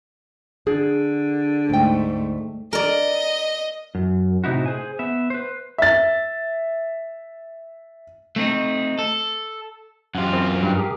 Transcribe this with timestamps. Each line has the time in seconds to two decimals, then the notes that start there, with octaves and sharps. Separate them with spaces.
0.67 D3 G#4
1.70 D2 G#2 A3 G5
2.73 A#4 D5 D#5
3.95 F#2
4.44 A2 C3 D#4 E4 F#4
4.66 G#4 C5 G#5
4.99 B3 E5
5.30 B4 C5
5.78 E5 A6
8.36 A3 C4 D4 D#4
8.99 A4
10.15 F#2 F4 G4 F#5
10.33 C4 A#4
10.63 G2
10.75 G4 G#4 A#4